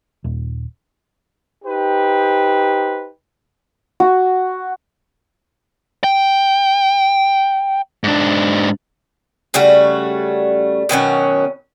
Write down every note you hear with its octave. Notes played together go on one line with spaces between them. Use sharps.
D#1
D#4 G4 B4 C5
F#4
G5
G#2 D4
C#3 G3 A3 F#4
B2 D#3 F#3 C#4